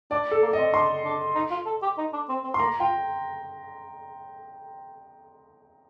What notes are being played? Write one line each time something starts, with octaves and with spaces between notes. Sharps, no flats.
D4 D5
A4
A#3
C4 D#5
D4 C6
D4
D#4
F4
A4
G4
D#4
D4
C4
C4
C6
A#3 A#5
F4 G5